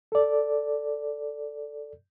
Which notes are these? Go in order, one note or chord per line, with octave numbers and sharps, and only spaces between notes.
A4 D5